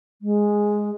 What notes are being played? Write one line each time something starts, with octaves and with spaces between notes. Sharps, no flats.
G#3